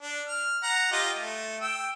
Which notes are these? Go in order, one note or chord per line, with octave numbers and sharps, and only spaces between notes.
D4
F6
F#5 A#5
F4 G4 D#5
A3
G5 E6